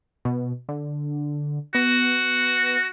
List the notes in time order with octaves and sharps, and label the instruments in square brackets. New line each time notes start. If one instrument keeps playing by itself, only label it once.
[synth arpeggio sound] B2
D3
[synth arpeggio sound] B3 [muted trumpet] F#4